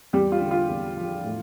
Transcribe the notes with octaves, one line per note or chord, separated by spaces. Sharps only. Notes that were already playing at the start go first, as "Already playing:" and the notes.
E2 G3 G4
F4
D3
F4
E2
F3
A2